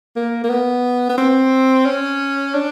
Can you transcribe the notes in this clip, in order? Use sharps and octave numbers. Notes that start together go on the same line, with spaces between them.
A#3
A#3
B3
B3
C4
C#4
D4